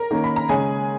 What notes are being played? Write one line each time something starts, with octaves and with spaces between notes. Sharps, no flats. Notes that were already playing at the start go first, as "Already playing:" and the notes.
Already playing: A#4 A#5
D#3 A#3 C#4
B5
A#5
C#3 G#3 C#4 G#4 G#5